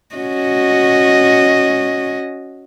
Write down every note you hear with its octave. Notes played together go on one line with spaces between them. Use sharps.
C#4 F#4 D#5